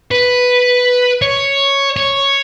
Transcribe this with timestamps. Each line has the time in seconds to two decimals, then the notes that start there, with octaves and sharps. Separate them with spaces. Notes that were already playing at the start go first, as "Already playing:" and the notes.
0.11 B4
1.22 C#5
1.96 C#5